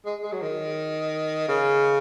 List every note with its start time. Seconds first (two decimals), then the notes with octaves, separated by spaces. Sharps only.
0.06 G#3
0.23 G#3
0.33 F#3
0.42 D#3
1.49 C#3